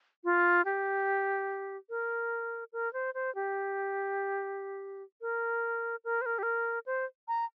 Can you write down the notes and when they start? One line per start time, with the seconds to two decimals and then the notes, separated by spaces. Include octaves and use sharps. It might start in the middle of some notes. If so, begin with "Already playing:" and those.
0.24 F4
0.65 G4
1.90 A#4
2.73 A#4
2.93 C5
3.14 C5
3.35 G4
5.21 A#4
6.05 A#4
6.22 C5
6.26 A#4
6.39 G4
6.43 A#4
6.86 C5
7.28 A#5